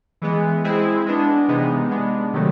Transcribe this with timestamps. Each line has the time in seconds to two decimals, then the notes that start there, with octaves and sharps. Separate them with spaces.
0.22 E3 G#3 B3
0.64 G#3 C4 E4 G#4
1.06 G#3 B3 D4
1.48 C3 E3 G#3 B3 D#4
1.91 G#3 B3 D4
2.33 C3 D#3 F#3 A3